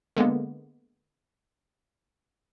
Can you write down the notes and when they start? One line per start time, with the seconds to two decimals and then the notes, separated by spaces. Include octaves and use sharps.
0.17 D3 G#3 A#3 B3